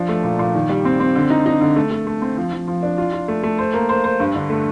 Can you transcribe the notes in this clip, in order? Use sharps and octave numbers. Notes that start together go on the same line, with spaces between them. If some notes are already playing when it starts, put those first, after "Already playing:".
Already playing: F3 D4
A3
A#2
A#2
D#3
G3
C4
C4
D3
D#4
D#4
D3
A3
A3
A3
C4
F3
F3
F3
D4
F4
F4
A3
A3
C5
A#3
C5
C5
G2
D3
A3